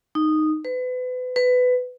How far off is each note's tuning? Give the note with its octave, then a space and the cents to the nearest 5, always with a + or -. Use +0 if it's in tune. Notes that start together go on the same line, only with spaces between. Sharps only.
D#4 -10
B4 +35
B4 +20